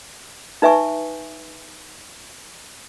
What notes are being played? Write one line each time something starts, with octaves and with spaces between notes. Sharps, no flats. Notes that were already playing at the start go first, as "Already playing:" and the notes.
D#4 B4 E5 G#5 C#6